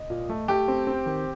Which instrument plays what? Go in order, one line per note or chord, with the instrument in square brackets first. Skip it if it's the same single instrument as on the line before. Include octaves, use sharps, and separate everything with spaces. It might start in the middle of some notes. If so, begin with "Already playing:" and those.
Already playing: [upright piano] D#5
[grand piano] A#2
A3
[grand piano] A3 [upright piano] G4
[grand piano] C4
C4
D#3